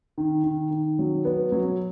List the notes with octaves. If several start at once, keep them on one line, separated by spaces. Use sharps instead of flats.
D#3
D#3
D#3
F#3
B3
F#3